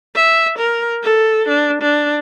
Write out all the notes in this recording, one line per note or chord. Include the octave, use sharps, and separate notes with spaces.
E5
A#4
A4
D4
D4